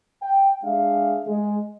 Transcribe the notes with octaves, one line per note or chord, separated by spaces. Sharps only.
G5
G#3 D4 G#4 E5 F5
G#3